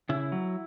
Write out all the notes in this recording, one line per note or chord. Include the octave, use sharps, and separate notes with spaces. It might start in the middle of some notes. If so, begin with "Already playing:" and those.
C#3 E4
F#3